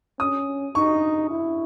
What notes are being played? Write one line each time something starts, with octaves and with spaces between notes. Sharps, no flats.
C#4 D#6
D#4 C#6
E4